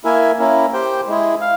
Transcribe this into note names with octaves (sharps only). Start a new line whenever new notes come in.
A#3 E4 A#4 E5 G#5
A#3 C#4 E4 A#4
G4 C5 G5
G#3 E4 G#4
F5